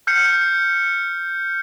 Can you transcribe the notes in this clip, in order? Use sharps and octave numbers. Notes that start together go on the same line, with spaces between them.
F6 G6 C7 C#7